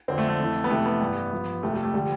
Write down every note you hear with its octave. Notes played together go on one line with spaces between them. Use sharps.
F2 D3 F3 C4
A3
A3
F2 E3
B3
F2 C3 E3 A3
B3
G2 E3
G2 F3
F2 C3 F3 A3
G3
A3
D3 F3 G3